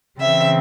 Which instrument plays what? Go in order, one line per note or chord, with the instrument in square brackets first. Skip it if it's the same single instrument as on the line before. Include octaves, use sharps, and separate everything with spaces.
[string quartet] C#3 E3 C4 E5